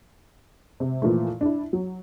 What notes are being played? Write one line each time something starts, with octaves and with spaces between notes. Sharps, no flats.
C3
A#2 E3 F3 A3
D4 E4
F#3